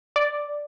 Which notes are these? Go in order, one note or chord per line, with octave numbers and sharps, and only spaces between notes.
D5